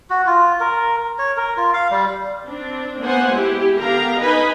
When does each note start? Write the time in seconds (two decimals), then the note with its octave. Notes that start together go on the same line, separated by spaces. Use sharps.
0.10 F#4
0.27 F4
0.60 A#4
1.19 C#5
1.37 A#4
1.57 F4
1.74 F5
1.91 G3
2.44 C4 D4
3.02 A#3 B3 C5 F#5 G#5
3.31 G#3 E4 G4
3.79 D3 B3 G4 A#4 F5 A#5
4.20 D#4 B4 D#5 G#5 B5